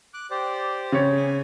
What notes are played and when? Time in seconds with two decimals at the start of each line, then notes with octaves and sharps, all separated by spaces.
0.14 D6 F#6
0.31 G4 C5 D5
0.92 C#3 C#5
1.17 G#5